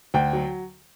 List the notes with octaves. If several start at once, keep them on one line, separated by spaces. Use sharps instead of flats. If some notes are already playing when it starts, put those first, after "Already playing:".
D2 G5
F#3